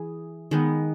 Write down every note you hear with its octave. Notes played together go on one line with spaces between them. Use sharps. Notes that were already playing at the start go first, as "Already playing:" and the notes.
Already playing: E3 G#4
D#3 G#3 B3